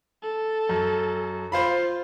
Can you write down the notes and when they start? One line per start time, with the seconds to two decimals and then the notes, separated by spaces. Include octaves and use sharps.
0.23 A4
0.69 F#2
1.52 F4 C5 F5 B5